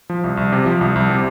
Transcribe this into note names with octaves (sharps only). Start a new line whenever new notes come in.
F3
C2
C2
C3
F3
C2
C2
C3